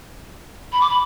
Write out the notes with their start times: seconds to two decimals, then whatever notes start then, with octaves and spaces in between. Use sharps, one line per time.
0.73 B5
0.81 D6
0.90 B5